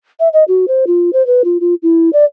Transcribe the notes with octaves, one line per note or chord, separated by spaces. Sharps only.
E5
D#5
F#4
C5
F4
C5
B4
F4
F4
E4
D5